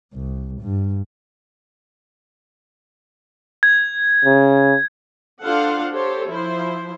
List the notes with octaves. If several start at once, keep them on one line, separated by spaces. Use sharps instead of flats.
C2
G2
G#6
C#3
D4 F4 A4 C5 F5 F#5
G4 A4 C5 C#5
F3 E4 C5